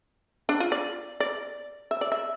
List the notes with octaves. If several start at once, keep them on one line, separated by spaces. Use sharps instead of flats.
D4
F4
D5
D5
E5
D5
E5